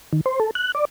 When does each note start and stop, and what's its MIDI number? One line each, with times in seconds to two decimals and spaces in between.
0.13 0.21 51
0.26 0.40 72
0.40 0.51 69
0.55 0.72 90
0.75 0.85 74